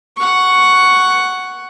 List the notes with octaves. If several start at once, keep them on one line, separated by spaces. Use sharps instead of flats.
F#5 C#6